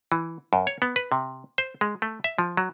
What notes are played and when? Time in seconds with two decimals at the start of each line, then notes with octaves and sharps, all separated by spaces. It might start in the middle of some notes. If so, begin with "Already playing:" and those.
0.12 E3
0.53 F#2
0.67 C#5
0.82 B3
0.96 B4
1.12 C3
1.58 C5
1.81 G#3
2.02 A3
2.24 E5
2.38 F3
2.57 F#3